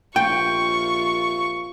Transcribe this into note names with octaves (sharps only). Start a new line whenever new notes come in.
A#1 C3 F4 G5 C#6